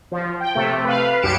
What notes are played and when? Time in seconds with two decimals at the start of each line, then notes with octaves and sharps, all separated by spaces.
0.12 F3
0.40 G5
0.55 C3 A3
0.84 B4 F5
1.22 C2 F#2 G4 C#7 D7 E7